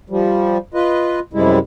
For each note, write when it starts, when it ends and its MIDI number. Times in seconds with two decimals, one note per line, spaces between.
0.10 0.58 53
0.10 0.58 55
0.74 1.20 65
0.74 1.20 71
0.74 1.20 75
1.33 1.59 42
1.33 1.59 48
1.33 1.59 55
1.33 1.59 56
1.33 1.59 64